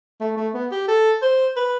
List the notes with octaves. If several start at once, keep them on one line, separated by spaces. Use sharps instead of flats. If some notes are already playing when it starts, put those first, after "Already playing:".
A3
A3
B3
G4
A4
C5
B4